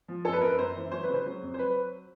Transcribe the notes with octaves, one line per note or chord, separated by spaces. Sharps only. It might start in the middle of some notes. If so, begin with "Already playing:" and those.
F3
F#2 A4
B4
F#2 A#4
B4
F#2 C5
E3
F#3 C5
B4
C#3 C5
F#3
F2
C5
F#3 B4